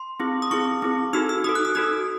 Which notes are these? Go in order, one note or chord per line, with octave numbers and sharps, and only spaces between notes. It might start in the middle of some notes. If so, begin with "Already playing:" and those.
Already playing: C6
C4 E4 G#4
D#6
C4 E4 G#4 C#6
C4 E4 G#4
D#4 F#4 A4 E6
E6
D#4 F#4 A4 D#6
F#6
E6
D#4 F#4 A4 D#6